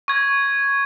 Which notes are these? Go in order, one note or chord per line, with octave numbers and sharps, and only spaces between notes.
C#6 G#6